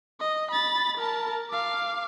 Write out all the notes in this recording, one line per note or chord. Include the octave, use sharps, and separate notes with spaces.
D#5
B5 A6
A#4 A5
F5 D6